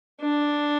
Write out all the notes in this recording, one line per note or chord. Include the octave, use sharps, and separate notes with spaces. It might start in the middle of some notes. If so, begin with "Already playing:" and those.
D4